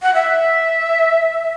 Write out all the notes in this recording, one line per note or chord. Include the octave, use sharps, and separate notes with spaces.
F#5
E5